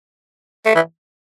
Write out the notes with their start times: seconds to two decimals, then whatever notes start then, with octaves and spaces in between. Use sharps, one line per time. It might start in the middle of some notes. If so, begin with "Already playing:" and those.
0.66 A3
0.75 E3